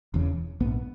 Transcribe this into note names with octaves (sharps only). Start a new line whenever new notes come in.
E1 E2 C#3
A#1 G#2 B3